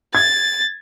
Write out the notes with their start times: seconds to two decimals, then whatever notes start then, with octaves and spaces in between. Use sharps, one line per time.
0.15 G#6 A6